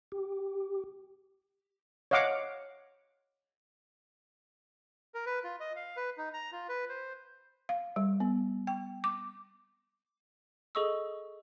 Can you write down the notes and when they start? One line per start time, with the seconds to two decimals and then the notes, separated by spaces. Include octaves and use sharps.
0.12 G4
2.11 C#5 D#5 F5 F#5 D6
5.14 A#4
5.26 B4
5.44 F4
5.60 D#5
5.76 F5
5.97 B4
6.18 D#4
6.34 A#5
6.52 F4
6.69 B4
6.89 C5
7.69 F5
7.96 G3
8.20 B3
8.67 G5
9.04 D6
10.75 G#4 A4 D#5 C#6 D#6 E6